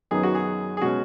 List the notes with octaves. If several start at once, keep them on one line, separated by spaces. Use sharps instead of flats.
F#2 D#3 F#3 B3 D#4 G#4
F#4
G#4
G#4
B2 G#3 C#4 F#4